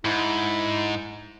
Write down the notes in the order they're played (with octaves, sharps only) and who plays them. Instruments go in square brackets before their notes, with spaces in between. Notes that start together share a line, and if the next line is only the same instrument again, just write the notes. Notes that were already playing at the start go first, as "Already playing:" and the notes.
[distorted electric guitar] G#2 [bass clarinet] E4